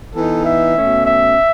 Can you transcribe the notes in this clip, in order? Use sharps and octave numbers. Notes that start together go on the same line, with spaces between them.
E3 B3 D#4 A4
E5
B2 A3 C#4
E5